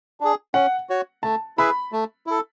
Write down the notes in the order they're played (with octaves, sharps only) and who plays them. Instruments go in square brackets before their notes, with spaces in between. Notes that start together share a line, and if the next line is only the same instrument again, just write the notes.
[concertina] D4 G#4
[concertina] C#4 [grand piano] F#5
[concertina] F#4 C#5
[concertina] A3 [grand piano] A5
[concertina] E4 G#4 B4 E5 [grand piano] B5
[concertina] A3
E4 A4